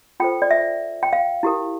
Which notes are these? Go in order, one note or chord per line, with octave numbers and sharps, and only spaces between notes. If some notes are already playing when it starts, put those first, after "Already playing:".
F4 A4 C5 G5
D5
E5
G5
F5
E4 G4 A#4